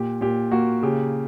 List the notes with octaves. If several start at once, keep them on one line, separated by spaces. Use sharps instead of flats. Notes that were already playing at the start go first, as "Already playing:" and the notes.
Already playing: A#2 G4
A#2 G4
A#3 F#4
C#3 G4